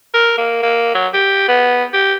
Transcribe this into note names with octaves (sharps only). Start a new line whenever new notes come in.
A#4
A#3
A#3
F#3
G4
B3
G4